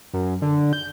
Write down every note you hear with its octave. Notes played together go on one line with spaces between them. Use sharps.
F#2
D3
G6